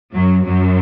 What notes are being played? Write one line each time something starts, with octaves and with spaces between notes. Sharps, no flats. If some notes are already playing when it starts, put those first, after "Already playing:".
F#2 F#3
F#2 F#3